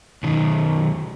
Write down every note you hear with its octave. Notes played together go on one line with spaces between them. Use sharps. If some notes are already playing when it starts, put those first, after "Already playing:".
B1 D#3